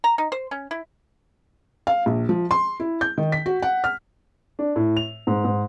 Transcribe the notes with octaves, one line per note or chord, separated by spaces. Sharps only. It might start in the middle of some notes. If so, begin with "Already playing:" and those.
A#5
D#4
C5
C#4
E4
F5
A#1
F3
C6
E4
G6
D#3
B6
F#4
F#5
F6
D4
A2
F7
G#2
G#2